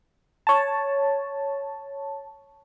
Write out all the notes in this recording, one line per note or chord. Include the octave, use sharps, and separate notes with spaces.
C#5 A5